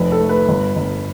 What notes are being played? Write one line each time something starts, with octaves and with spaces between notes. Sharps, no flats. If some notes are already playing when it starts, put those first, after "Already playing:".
Already playing: F1 B4
A4
A3
B4
G1
G1